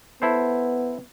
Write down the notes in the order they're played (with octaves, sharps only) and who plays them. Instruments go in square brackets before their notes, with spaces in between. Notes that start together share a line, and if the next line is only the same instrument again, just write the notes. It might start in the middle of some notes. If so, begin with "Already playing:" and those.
[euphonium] B3 [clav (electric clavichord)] E4 A4 C5